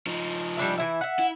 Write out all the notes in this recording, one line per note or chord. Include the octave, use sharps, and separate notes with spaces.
F3 D#4
G3 D4 E5
E3 E4 E5
E5 F#5
E4